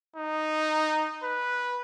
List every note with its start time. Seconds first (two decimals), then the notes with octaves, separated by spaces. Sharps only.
0.16 D#4
1.24 B4